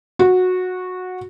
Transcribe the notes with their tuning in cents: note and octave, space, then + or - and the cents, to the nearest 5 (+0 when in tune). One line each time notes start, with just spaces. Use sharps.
F#4 -15